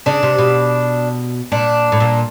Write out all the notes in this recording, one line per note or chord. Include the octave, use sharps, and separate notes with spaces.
C#3 D4
C3
B2
A#2 D4
A2
A#2